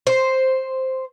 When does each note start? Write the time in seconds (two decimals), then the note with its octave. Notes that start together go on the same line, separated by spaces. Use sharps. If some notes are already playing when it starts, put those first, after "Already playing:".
0.07 C5